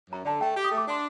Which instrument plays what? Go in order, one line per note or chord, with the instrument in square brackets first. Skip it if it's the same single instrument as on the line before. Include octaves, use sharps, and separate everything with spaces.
[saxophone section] F#2 [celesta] A#5
[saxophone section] D3 [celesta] A5
[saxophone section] A3 [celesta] G5
[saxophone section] G4
[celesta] D#6
[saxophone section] A3
[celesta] D6
[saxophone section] D4 [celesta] C6